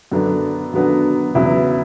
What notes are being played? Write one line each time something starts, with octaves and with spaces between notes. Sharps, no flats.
F#2 D3 F#3 B3 D4
F#2 D3 F#3 B3 D4
E2 C#3 F#3 B3 E4